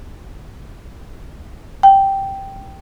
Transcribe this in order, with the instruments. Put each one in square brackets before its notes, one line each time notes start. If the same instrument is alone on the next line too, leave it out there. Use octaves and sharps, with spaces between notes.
[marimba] G5